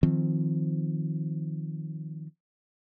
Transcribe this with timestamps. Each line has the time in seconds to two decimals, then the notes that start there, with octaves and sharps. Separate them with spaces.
0.03 D#3 F3 C4